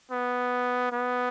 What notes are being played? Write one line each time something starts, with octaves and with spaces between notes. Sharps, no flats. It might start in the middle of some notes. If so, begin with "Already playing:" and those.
B3
B3